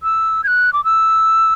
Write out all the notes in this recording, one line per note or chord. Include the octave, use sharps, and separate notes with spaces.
E6
G#6
F#6
D6
E6